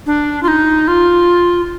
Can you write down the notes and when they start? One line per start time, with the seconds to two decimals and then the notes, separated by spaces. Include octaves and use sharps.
0.06 D4
0.43 F4
0.48 D#4
0.88 F4